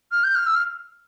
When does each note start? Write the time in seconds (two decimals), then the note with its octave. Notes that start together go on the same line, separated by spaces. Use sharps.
0.12 F6
0.24 G6
0.35 F6
0.47 E6
0.55 F6